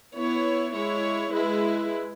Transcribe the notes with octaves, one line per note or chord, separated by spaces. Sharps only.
B3 E4 C#5
G#3 E4 C#5
G#3 E4 B4